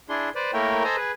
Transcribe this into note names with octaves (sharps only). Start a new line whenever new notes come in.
D4 E4 G#4 C6
B4 C5 D5
A3 A#3 E4 A#4 C#5 G5
A4 C5 D#5 G#5 A#5
G#4 B4